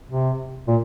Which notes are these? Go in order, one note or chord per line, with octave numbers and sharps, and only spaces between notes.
C3
A#2